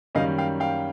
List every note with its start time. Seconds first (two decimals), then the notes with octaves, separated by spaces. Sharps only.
0.15 F#2 D#3 G3 A#3 C#4 D#5 F5
0.38 F5 G5
0.60 F5 G5